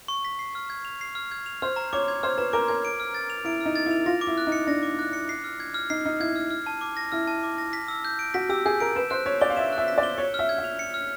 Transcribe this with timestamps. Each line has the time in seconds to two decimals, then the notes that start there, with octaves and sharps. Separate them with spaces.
0.08 C#6
0.25 B6
0.39 C7
0.55 F6
0.70 G#6
0.85 F7
1.01 C7
1.15 F6
1.31 G#6
1.46 F7
1.62 C5 F6
1.76 A#5
1.93 C#5 D6
2.08 G#6
2.23 C5 F6
2.38 B4 A#5
2.53 A#4 D6
2.68 A#4 G#6
2.85 D7
3.00 F6
3.14 A6
3.30 F7
3.45 E4 D7
3.61 D#4 F6
3.76 A6
3.86 E4
3.91 F7
4.06 F4 A#6
4.21 D6
4.27 E4
4.38 F#6
4.47 D#4
4.52 C#7
4.67 D4 A#6
4.83 D6
4.99 F#6
5.13 C#7
5.29 C7
5.44 F6
5.60 G#6
5.74 F6
5.90 D#4 C7
6.05 D#4 F6
6.20 E4 G#6
6.36 F6
6.50 F6
6.66 A5
6.81 D6
6.97 A#6
7.12 E4 F6
7.27 A5
7.43 D6
7.58 A#6
7.73 B6
7.88 E6
8.05 G6
8.19 D7
8.34 F#4 B6
8.49 G4 E6
8.66 G#4 G6
8.80 A#4 D7
8.96 B4 E7
9.10 C5 F#6
9.26 C#5 B6
9.41 D5 G7
9.50 F5
9.56 E5 E7
9.73 F#6
9.78 E5
9.88 B6
9.98 D5
10.03 G7
10.18 C#5 C#7
10.34 F6
10.39 E5
10.49 G#6
10.58 E5
10.64 F7
10.79 C#7
10.94 F6